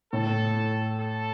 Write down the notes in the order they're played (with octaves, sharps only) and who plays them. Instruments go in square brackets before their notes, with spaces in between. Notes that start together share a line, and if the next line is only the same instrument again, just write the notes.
[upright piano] A2 [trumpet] A4
[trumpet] A4